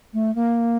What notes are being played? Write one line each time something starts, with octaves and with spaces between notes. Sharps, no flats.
A3
A#3